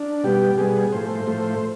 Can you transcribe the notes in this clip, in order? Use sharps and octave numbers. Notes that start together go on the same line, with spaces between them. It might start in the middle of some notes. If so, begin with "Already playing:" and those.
Already playing: D4
B2 G3 B3 G4
B2 G3 B3 G#4
A2 F3 A3 C5
A2 F3 A3